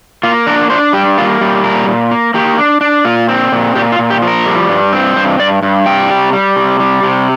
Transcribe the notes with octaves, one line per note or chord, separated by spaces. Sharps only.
A#3 F4
D4 A#4
D4 C5
G3 G4
A#3 F4
G3
A#2 A#4
A#2
A#3
A#3 G4
D4
D4
A#2 F4
C4
A#2
A#2 G4
F4
A#2
G4
F3
A#4
G3
G2
C4
G2 C5
G2 D5
G2
C3 G5
G3
G3
C3
G3
C3